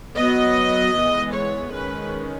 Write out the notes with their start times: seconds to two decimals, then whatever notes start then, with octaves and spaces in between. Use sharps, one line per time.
0.17 F#3 B3 D#5
0.96 E3 G#3 B3
1.34 C#5
1.73 D#3 G#3 C#4 B4